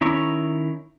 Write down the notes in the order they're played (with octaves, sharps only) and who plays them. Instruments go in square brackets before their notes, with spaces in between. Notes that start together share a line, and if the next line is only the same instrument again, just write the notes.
[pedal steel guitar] D#3 C#4 E4 A#5 C#6